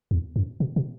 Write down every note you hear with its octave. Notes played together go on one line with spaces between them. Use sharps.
E2
F#2
B2
B2